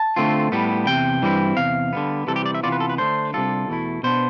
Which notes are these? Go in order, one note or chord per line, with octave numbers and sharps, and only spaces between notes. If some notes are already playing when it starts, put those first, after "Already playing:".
Already playing: A5
D3 A3 C4 F4
A2 G3 B3
E2 C3 G5
G2 E3 G3 C4 E4
E2 C3 F5
D3 G3 B3
C3 E3 G3 A4
G4
D5
E5
C3 E3 B3 F4 D5
B4
A4
B4
D3 A3 D4 C5
C2 C3 G3 D4 F4 A4
E2 B2 A3 E4
B2 B3 D4 C5